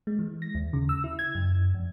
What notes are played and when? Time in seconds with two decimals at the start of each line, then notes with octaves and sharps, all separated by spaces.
0.07 G#3
0.19 E3
0.42 A#6
0.55 D#2
0.73 C#3
0.89 E6
1.04 E4
1.19 G#6
1.35 F#2
1.74 F2